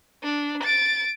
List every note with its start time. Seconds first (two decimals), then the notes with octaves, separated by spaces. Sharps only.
0.23 D4
0.63 A6 D7